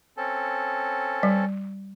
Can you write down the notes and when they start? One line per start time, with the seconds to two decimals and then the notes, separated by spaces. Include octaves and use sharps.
0.17 C4 C#4 A4
1.23 G3